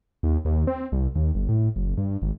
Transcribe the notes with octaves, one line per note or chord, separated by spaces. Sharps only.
D#2
D#2
C4
C2
D#2
G1
A2
F#1
G2
G#1